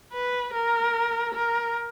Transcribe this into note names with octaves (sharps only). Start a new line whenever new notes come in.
B4
A#4
A#4